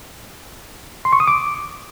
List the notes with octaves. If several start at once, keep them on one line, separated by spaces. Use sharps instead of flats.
C6
C#6
D#6
D6